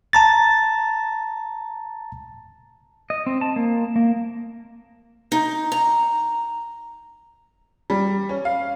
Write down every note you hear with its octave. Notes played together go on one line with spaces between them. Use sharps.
A5 A#5 A6
D#5
C4
A5
A#3
A#3
D#4
A#5
G3
C#4
F5